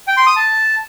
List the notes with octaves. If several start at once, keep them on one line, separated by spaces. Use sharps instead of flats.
G5
C6
D#6
A5